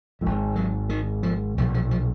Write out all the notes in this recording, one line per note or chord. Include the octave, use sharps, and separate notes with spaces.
G#1 G#2 F3
F#3
D#3
F3
B1 A#2 F3
F3
F3